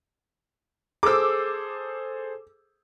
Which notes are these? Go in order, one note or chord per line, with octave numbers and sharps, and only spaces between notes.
G#4 A4 C5 D6 E6